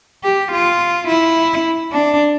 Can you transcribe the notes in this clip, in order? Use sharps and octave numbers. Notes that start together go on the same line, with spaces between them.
G4
F4
E4
D4